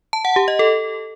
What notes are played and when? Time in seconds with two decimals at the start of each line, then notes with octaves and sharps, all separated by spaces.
0.13 A5
0.25 F#5
0.36 G4
0.48 D#5
0.59 A4